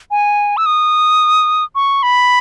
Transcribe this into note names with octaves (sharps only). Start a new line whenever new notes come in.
G#5
E6
D#6
C#6
B5